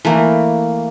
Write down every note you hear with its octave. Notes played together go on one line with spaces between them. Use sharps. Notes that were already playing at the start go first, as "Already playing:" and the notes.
E3 A3 A#3